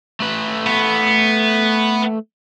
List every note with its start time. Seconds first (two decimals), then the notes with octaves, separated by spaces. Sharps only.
0.20 A3 B4
0.67 B3